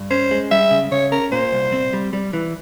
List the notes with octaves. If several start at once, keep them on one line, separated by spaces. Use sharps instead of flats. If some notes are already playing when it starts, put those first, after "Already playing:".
Already playing: G2
C#4 C5
G#3
G3 E5
C#3
C#3 C#5
C#4 A#4
A#2 C5
C2
C4
G3
G3
E3